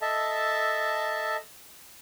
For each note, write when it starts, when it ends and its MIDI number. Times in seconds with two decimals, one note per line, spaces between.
0.02 1.37 69
0.02 1.37 75
0.02 1.37 76
0.02 1.37 81